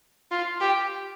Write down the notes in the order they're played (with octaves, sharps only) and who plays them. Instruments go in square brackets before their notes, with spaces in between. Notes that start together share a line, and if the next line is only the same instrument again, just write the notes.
[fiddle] F4
G4